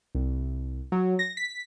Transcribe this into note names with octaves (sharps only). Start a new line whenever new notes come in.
C2
F#3
A#6
B6